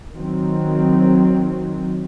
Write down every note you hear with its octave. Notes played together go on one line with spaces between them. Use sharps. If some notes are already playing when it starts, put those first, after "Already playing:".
D#3 F#3 C4